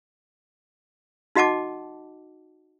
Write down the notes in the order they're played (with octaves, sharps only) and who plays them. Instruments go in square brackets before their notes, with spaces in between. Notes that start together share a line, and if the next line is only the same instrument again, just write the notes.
[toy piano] D#4 F#4 D#5 F#5 A5 D6